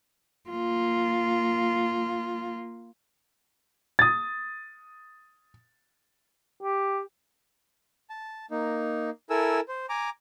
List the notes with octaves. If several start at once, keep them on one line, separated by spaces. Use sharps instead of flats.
A#3 F4
D#6 A6
G4
A5
A#3 D#4
E4 A4 A#4 G#5 E6
C5
G#5 A#5 D6